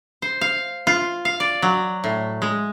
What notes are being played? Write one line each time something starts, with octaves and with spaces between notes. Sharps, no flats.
C5
F5
F4
F5
D5
F#3
A2
G#3